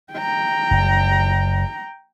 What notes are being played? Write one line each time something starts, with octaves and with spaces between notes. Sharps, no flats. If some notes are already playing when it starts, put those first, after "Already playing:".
G5 A#5
F#1